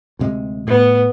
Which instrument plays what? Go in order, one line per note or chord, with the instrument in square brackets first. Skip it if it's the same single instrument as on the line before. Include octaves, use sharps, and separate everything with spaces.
[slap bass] D2 C3 G#3
[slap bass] A2 [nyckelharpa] B3